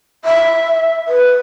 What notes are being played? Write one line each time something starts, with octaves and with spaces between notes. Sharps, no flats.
E5
B4